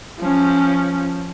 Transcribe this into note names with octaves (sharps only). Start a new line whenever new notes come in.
F3 C#4